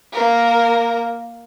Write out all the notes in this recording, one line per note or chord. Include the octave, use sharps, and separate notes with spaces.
A#3 A#4